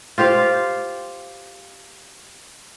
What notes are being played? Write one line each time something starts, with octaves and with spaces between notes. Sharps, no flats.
F4 G4 C5 F5